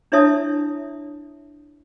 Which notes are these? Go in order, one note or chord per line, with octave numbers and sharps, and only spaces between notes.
D4 E4 C#5 E5 A5 D#6